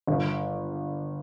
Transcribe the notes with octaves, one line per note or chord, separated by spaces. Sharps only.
G1